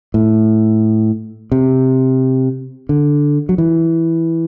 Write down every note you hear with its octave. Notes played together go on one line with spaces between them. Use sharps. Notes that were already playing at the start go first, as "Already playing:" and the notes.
A2
C3
D3
F#3
E3